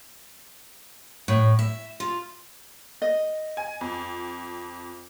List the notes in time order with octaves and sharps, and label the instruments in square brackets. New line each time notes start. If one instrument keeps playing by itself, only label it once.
[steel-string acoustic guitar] A2
E5
F4
[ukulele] D#5
[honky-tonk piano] G#5
F2